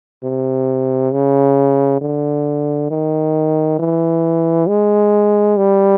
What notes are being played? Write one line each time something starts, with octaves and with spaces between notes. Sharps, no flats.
C3
C#3
D3
D#3
E3
G#3
G3